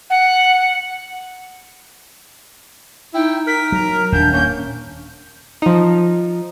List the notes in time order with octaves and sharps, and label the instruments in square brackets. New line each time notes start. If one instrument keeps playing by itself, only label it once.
[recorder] F#5
[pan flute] D#4 [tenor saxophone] E4 [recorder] G5
[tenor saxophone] A#4 [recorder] B6
[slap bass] F#3 [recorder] A#5
[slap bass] D#1 [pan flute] D4 [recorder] G6
[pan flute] A#3 [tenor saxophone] C#4 [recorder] G6
[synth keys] F3 D#4